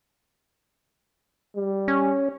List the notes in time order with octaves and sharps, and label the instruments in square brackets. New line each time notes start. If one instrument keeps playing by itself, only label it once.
[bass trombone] G3
[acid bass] C#4